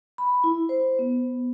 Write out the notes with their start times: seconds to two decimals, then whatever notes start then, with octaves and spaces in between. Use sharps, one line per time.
0.18 B5
0.44 E4
0.69 C5
0.99 B3